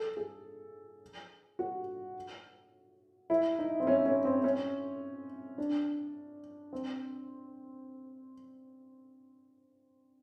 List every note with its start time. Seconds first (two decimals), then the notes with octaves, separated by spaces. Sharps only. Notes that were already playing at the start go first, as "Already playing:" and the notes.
Already playing: A4
0.17 G#4
1.59 F#4
3.30 E4
3.59 D#4
3.80 C4
3.87 C#4
4.06 C#4
4.25 C4
4.44 C#4
5.58 D4
6.73 C4